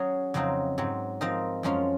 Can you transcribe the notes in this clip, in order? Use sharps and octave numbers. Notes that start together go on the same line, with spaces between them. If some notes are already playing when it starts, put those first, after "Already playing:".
Already playing: F#3 C#4 G#4
F2 C#3 F#3 C4 D#4
G#2 F#3 C4
F3 C4 D#4 A#4
F#2 F3 G#3 C#4 F4